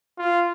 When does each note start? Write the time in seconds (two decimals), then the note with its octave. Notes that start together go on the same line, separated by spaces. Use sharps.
0.18 F4